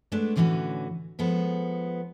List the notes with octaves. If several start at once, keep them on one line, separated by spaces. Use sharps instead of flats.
G#3 A3 B3 D4
A2 D3 E3 C#4 F#4
F3 G#3 B3 A4